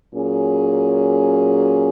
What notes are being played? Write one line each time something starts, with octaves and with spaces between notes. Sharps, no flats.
A#2 F#3 C#4 G#4